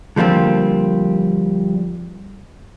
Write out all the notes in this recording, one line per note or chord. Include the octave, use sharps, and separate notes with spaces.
D3 F3 G3 A#3 C4